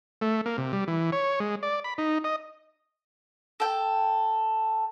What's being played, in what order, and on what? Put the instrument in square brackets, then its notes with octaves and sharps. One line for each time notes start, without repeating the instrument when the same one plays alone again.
[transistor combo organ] A3
A#3
C3
G3
E3
C#5
G#3
D5
B5
D#4
D#5
[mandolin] A4 G5